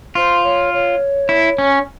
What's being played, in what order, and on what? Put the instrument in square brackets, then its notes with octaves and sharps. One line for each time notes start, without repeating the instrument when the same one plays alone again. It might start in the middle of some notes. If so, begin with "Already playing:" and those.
[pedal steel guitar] F4 [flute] C5
[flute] C#5
C#5
[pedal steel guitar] E4
C#4